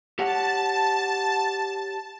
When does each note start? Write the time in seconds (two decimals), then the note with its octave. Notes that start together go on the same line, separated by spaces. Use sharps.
0.19 G4 C#5 F#5 A5